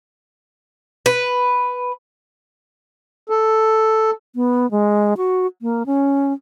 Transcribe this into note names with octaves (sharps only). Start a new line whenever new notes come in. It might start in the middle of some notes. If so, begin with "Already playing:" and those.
B4
A4
B3
G#3
F#4
A#3
C#4